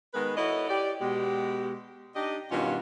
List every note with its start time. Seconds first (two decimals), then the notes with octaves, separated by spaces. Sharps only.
0.14 D#3 G#3 B3 G#4 A#4 B4
0.37 E4 F#4 A4 C#5 D#5
0.69 G4 D5
1.01 B2 G#3 G4
2.15 D4 D#4 G4 D#5
2.50 G2 B2 D#3 C#4 F4